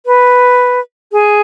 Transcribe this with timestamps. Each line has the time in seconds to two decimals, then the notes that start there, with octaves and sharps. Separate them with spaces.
0.06 B4
1.12 G#4